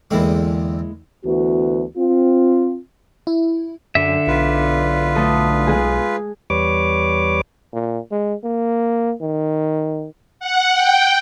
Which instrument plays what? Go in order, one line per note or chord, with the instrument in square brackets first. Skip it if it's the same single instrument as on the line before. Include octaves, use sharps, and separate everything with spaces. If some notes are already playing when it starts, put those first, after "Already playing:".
[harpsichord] E2 D3 C4 [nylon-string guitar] G#3 A#3 E4
[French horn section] D2 E3 B3 F#4
C4 F4
[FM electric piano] E4
[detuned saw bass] F#2 [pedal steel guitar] D3 E5
[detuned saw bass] B1 [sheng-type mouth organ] F4 B4
[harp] A3 A4 D#6
G#3 G#4 G#5
[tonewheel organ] E2 G3 B4 C#5 D6
[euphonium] A#2
G#3
A#3
D#3
[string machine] F#5
G5